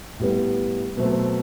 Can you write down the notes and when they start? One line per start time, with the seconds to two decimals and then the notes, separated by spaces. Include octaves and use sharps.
0.19 A2 G3 B3
0.97 B2 F#3 A3 C4